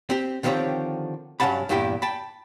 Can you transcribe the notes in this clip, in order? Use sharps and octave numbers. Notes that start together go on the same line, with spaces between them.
C4 G4
D3 D#3 F3 C4 G4 C#5
G2 F#3 C#4 F#5 A5 B5
E2 G2 A#2 E4 G4 G5
G5 A5 B5